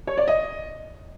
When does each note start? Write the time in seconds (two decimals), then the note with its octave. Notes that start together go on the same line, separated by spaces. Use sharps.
0.07 C#5
0.17 D5
0.28 D#5